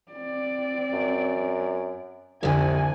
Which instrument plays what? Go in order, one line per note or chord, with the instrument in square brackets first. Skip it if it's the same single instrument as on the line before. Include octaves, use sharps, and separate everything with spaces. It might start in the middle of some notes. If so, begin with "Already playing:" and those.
[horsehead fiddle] C4 D5
[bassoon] F#2
[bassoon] C2 [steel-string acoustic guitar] F2 D3 [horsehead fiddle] G#5